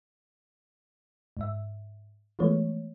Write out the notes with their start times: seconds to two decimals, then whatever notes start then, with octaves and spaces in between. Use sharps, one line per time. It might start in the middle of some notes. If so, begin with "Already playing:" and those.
1.37 G#2 E5
2.39 E3 F3 G#3 A3 B3 C#5